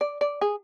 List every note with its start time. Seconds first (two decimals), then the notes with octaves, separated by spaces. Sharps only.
0.01 D5
0.21 D5
0.41 G#4